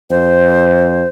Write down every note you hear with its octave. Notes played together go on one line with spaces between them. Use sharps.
F2 C5